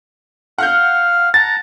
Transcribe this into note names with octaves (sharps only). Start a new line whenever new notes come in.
F5 F#5 F6 G6
F#5 A5 A#5 A6